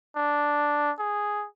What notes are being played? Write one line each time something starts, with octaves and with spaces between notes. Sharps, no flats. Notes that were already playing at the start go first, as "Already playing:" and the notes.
D4
G#4